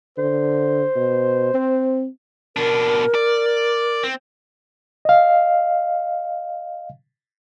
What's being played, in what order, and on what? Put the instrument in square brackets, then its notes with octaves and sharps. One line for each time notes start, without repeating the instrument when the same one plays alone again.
[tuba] D3 [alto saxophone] C5
[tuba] B2
C4
[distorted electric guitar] B2 D4 [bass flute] A#4
[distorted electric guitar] D5
C4
[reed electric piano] D#5 F5